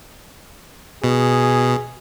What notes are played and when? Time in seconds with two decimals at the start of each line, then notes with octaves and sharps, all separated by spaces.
1.04 B2 G#4